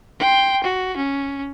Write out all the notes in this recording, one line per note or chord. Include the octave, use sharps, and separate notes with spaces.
G5 C6
F#4
C#4